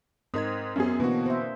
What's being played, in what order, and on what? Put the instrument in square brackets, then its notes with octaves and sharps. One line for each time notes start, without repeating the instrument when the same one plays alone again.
[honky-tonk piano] G#2 [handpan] C4 A#4 D#5 [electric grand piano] D#6 G#6
[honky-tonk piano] F#2 F#3 G#4 [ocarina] B3 [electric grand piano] C#4
[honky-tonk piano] B2 D3 [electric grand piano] E3 F#4 [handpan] A#3 C4 D4
[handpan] C5 E5